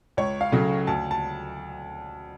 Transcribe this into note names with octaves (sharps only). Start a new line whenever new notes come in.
C#2 C#5
F5
C#3 F#3 A3
D2 A5
A5